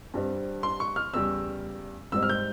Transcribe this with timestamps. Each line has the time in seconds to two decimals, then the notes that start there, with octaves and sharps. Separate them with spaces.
0.14 G2 G3 C4
0.63 C6
0.80 C#6
0.96 F6
1.14 E2 C#3 G3 E6
2.12 G#2 G3 C4 E6
2.23 F6
2.29 G6